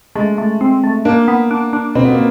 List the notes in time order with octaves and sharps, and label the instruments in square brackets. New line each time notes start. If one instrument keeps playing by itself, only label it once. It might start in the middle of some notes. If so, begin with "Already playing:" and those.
[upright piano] G#3 [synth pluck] A3
[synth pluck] A3
C4
A3
[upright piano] A#3 [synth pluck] D4
[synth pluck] B3
D4
D4
[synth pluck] B2 [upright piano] C4
[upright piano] B3
A#3